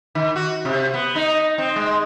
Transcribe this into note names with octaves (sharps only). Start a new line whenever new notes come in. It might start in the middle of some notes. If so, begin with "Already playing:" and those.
D#3
F#4
C3
B3
D#4
C4
G#3